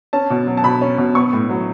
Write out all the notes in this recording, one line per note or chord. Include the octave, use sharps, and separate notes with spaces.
C#4 A5
B2
F#3
A5
B2 B5
C#4
B2
B3 C#6
A2
F#3